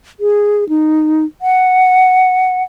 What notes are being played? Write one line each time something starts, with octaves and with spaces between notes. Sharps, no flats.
G#4
D#4
F#5